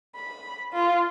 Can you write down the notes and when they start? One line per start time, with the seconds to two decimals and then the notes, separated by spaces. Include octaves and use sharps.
0.15 B5
0.73 F4